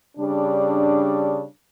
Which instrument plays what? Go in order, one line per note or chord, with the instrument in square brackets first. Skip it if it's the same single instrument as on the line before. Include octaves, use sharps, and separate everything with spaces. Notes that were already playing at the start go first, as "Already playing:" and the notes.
[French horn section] C#3 G3 D4